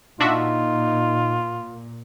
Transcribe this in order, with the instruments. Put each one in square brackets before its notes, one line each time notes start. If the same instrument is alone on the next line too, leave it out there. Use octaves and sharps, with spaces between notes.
[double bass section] A#2 [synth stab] D4 F#4 E5 [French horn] D#4 [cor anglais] F4